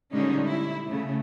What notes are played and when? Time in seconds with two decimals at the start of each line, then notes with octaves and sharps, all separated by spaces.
0.12 A#2 D3 G3 G#3 C#4 D#4
0.46 E4
0.87 C#3 A3